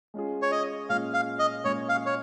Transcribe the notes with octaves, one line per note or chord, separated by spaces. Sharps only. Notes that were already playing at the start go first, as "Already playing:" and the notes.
G#3 C#4 F4 G#4
C#5
D#5
A#2 G#3 C#4 F4 F5
F5
D#5
A#2 G#3 C#4 F4 G#4 C#5
F5
C#5